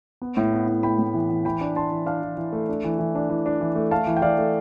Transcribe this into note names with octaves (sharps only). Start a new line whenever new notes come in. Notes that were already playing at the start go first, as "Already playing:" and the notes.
B3
A2
B3
A2
A2 G5 B5
A2
E3
E3
E3 G5 B5
D4
D4 A5 C6
E3
D4 F5 A5
E3
E3
A3
D4
E3
E3
D4
E3
D4
E3
A3
A3 F5 A5
E3
G5
E3 D5 F5
A3